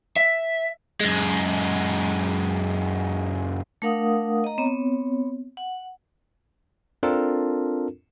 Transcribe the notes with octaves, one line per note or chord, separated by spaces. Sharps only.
E5
F#2 G#3
A3 D4 A#4 F5 F#5 D#6
D#5 A#5
B3 C4 C#5
F#5
C4 D4 F4 A4 A#4